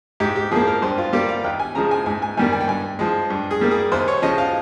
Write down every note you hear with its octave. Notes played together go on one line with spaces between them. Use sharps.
G#2 G4
G4
F3 A#3 G#4
A#4
G2 C5
F4
G3 A#3 G4
F5
D#2 G5
G#5
C#3 F3 G#3 A#5
G#5
G#2 G#5
G#5
D#3 G3 A#3 G#5
G#5
G5
G2 G#5
F3 G#3
G2
G#4
G3 A#3
G#4
D#2 C5
C#5
C#3 F3 D#5
F5